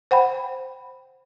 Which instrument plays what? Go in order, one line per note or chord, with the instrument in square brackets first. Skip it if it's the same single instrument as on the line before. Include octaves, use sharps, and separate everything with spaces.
[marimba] C5 F#5 G5 B5